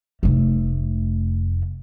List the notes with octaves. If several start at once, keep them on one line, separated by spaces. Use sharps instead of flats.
F1 A3